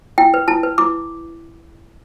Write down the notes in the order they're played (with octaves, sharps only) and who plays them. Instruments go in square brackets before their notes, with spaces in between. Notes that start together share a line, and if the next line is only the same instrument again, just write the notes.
[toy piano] E4 G5
B4
E4 A5
B4
E4 D6